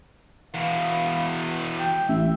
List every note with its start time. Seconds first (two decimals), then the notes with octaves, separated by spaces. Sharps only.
0.54 E2 B2 F5
1.79 G5
2.09 A1 E5